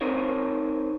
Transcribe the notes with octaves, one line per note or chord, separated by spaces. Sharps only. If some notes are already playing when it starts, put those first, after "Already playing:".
C4 D#4 A#4 C5 C#5